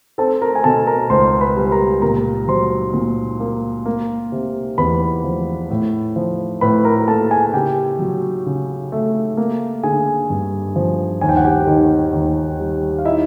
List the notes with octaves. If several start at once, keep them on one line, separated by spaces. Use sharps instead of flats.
C4 A4 A5
A#4 A#5
G#5
B2 A4 A5
A#4 A#5
C#2 C5 C6
B4 B5
G3
A#4 A#5
A#2 A#4 A#5
F#3 C5 C6
A#2
A#3
A#3
C3
E2 B4 B5
F3
A2
F3
A2 B4 B5
A#4 A#5
A#3 A4 A5
G#4 G#5
G#5
C#3 G4 G5
F#3
C#3
A3
A#3
D3 G#4 G#5
G2
F3
D#2 G#5
G5
F#5
G4 G5
D#3
D#2
G3
F5
D#4 E4 E5